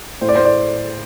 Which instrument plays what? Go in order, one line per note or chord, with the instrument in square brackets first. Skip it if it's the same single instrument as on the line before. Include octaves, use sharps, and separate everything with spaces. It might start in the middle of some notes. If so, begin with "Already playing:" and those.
[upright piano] A2 C5
D5
A2 C5
D5